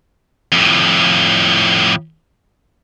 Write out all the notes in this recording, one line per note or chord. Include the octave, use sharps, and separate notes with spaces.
F2 A2